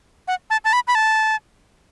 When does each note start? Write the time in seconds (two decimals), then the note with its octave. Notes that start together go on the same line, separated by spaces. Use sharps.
0.28 F#5
0.50 A5
0.65 A5
0.73 B5
0.88 B5
0.95 A5